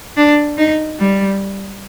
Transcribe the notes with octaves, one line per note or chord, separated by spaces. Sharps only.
D4
D#4
G3